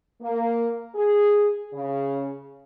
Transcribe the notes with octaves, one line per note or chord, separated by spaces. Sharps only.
A#3
G#4
C#3